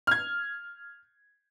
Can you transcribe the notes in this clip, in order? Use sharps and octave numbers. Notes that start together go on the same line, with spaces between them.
F6 G#6